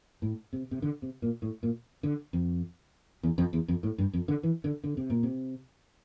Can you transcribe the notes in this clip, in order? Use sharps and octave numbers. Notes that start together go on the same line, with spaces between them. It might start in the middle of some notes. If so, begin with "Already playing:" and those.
A2
C3
C3
D3
C3
A#2
A2
A#2
D3
F2
E2
F2
E2
F2
A2
G2
F2
D3
E3
D3
D3
C3
A#2
C3